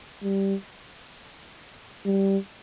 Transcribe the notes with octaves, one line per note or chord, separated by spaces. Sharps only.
G3
G3